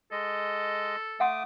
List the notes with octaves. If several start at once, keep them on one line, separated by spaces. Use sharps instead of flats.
G#3 A4 D#5
A3 F5 F#5 C6 D6 D#6